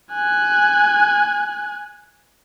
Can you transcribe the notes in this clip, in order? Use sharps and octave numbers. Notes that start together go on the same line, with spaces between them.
G#5 F#6